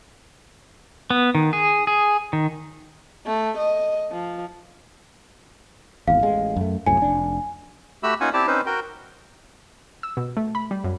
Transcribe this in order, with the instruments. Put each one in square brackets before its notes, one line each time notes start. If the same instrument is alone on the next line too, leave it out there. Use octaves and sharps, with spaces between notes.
[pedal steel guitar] B3
D#3
G#4
G#4
D#3
[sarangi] A3
D#5
F3
[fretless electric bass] G#1 E2 [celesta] F5
[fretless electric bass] A1 G#3
F#2 A3
[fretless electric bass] C2 F#2 A2 [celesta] G#5
[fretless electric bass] F1 D4
[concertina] A3 F#4 G4 E5 B5 E6
A#3 C#4 D#4 F4 F#5 G#5
C4 E4 G4 D5 A5
C4 C#4 D#4 B4 C5
F#4 A#4 G5
[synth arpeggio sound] E6
B2
A3
B5
G3
F#2